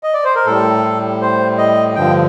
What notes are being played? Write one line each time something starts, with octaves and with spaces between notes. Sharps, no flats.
D#5
D5
C5
A#4
A2 G3 A4
C5
D#5
G2 D3 F3 G5